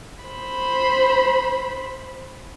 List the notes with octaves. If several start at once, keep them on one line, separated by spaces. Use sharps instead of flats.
C5 B5